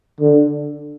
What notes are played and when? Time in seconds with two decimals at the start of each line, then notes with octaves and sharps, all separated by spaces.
0.21 D3